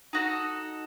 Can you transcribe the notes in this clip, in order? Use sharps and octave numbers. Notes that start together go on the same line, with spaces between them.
D#4 F#4 A4